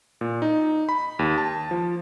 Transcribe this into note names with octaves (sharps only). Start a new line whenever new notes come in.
A#2
D#4
B5
D#2
A5
F3